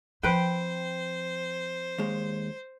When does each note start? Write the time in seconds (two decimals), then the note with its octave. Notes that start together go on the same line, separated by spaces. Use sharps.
0.23 F3 C4 B4 C5 G5
1.98 D#2 G#3